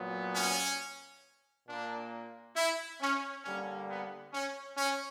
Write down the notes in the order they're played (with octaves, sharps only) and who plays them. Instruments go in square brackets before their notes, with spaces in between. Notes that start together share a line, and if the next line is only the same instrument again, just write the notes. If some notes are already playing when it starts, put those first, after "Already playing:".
Already playing: [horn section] A#2 F#3 B3
C#4
A#2 A#3 D4
E4
C#4
D3 G3 A#3 C#4
B3
C#4
C#4